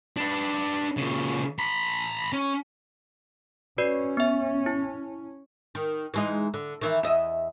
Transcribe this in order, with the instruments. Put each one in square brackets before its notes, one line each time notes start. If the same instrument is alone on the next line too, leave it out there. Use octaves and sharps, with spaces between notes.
[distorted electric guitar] D4 B4
A#2 C#3
A#5 B5
C#4
[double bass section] C#4 [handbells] F#4 B4 D5
[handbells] B3 E5
E4
[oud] D#3
E3 G#3 D#4
D3
D#3 E3 E4
E2 D#5 E5